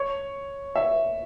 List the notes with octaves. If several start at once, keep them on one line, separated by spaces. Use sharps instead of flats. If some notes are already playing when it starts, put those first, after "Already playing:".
Already playing: C#5
E5